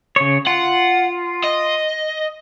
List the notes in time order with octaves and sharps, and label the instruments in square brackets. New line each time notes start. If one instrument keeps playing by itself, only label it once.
[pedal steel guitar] C#3 C#5
[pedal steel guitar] F4 [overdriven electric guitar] F#5
[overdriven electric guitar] D#5